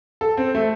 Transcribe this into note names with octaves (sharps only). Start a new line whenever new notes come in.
A4
C4
A3